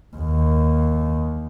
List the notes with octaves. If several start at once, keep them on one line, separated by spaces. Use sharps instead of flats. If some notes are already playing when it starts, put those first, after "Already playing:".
D#2